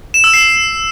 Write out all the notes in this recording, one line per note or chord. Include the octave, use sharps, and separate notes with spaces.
E7
E6
C7